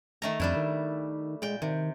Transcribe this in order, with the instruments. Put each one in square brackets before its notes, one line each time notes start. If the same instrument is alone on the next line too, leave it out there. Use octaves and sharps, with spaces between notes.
[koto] D#3 A3 A#5
[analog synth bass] F2 [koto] G3 D4 E4
[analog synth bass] D#3
[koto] A#2 G5 [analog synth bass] G#3
[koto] C3 [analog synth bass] D#3